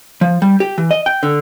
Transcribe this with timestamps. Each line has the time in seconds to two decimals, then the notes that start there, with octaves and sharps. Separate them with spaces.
0.21 F3
0.42 G3
0.60 G4
0.78 E3
0.91 D#5
1.06 G5
1.23 D3